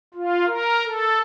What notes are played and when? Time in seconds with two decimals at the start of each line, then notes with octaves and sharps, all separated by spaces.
0.14 F4
0.46 A#4
0.85 A4